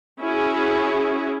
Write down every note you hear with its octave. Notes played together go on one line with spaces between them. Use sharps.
C#4 E4 F#4 G#4